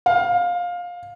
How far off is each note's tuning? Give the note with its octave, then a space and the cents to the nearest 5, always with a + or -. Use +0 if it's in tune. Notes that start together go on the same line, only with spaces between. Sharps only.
F5 +15